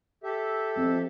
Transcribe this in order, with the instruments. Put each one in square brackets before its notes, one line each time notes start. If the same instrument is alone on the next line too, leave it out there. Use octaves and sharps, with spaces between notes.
[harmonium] G4 A4 E5
[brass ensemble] F2